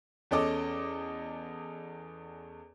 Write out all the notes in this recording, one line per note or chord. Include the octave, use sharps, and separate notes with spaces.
E2 C#4 A4 D#5 D6